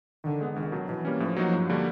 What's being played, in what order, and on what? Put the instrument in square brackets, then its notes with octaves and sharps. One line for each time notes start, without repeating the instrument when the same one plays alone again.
[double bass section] D3 [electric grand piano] D#3
[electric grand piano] G#3 B3
[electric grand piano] C#2 [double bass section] D#3
[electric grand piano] B2 F#3
[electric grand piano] B2 [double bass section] E3
[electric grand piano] G3 A#3 C#4
[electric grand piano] A2 [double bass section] F3
[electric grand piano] F#3 A#3 D#4 F#4
G2
D3 G3 A#3 D4